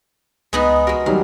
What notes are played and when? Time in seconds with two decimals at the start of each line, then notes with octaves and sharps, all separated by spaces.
0.53 C#2 G#3 B3 D#4
0.87 G#3 F#4 A#4
1.06 D#2 F#3 G3 F5